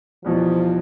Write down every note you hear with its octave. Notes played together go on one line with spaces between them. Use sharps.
E2 B2 F3 G3